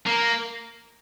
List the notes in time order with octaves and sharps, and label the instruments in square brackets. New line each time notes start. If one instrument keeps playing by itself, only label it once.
[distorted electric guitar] A#3